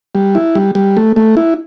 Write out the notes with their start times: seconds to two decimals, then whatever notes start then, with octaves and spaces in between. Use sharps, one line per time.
0.15 G3
0.35 E4
0.55 G3
0.75 G3
0.97 A3
1.16 A3
1.37 E4